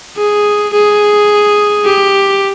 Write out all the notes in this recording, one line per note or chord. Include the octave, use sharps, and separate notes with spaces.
G#4
G#4
G4